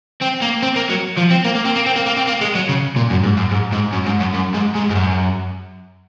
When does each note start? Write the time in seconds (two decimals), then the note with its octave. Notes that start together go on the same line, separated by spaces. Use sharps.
0.21 C4
0.41 A#3
0.63 C4
0.76 A#3
0.90 F#3
1.18 F3
1.31 C4
1.45 A#3
1.55 A#3
1.65 C4
1.76 A#3
1.86 C4
1.96 A#3
2.06 A#3
2.17 C4
2.27 A#3
2.41 G#3
2.55 F#3
2.69 C#3
2.96 A#2
3.10 F#2
3.24 G#2
3.37 F#2
3.51 G#2
3.72 G#2
3.92 F#2
4.06 G#2
4.20 F#2
4.34 F#2
4.54 G#2
4.75 G#2
4.90 G#2
4.95 F#2